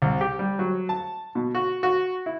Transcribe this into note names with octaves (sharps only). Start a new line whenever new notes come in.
C2
G4
G3
F#3
A5
B2
F#4
F#4
E4